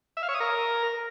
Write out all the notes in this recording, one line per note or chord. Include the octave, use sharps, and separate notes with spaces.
E5
F5
C#5
D#6
A#4